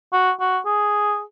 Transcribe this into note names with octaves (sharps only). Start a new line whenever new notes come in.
F#4
F#4
G#4